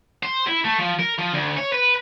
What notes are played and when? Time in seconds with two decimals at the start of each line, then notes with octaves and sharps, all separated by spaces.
0.23 C5
0.47 E4
0.65 A3
0.79 F3
0.99 A#4
1.19 F3
1.34 D2
1.58 C#5
1.73 B4